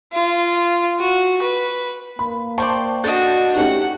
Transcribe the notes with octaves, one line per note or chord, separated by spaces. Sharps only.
F4
F#4
B4
A#3 B5
C5 D5 G5 A5 C6 C#6
D4 F#4 A4 D#5 G6
A3 C#4 D#4 G4 F#5